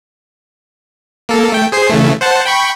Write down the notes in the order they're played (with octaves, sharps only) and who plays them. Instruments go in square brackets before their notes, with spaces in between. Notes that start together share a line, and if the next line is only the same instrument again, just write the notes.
[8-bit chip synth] A#3 A4
A3 G5
G#4 C5 C7
C#3 E3 A3
C5 F#5 A5
G5 B5 C#6